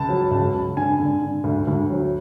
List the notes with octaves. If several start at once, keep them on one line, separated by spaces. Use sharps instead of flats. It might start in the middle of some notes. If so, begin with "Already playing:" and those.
Already playing: C#2 A5
F#3
C#2
C#2
D3 G#5
D3
D3
D2
D2
F#3